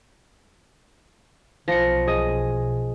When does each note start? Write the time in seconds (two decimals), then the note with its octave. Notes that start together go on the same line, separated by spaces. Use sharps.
1.68 B1 F3 A#6 C#7
2.07 G#4 D#5